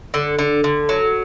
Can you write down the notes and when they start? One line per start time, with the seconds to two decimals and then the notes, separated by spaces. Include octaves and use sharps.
0.14 D3
0.39 D3
0.64 D3
0.89 F#3